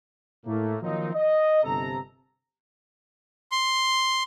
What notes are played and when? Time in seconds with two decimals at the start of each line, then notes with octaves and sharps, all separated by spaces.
0.45 A2 A3 A#3
0.81 D#3 F3 F#3 A#3 C4 D#4
1.14 D#5
1.63 G1 C3 A4 A#5
3.52 C6